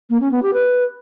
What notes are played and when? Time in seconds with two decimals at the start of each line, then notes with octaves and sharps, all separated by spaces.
0.10 A#3
0.21 C#4
0.32 B3
0.43 G4
0.53 B4